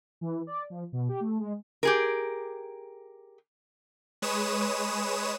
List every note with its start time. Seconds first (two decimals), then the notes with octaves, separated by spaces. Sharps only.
0.21 E3
0.47 D5
0.70 F3
0.92 B2
1.09 G4
1.20 A3
1.39 G#3
1.83 G4 G#4 A#4
4.22 G#3 B4 C#5 D#6 E7